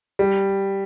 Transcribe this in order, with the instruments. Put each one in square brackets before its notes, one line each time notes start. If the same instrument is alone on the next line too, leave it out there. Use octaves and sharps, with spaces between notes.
[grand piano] G3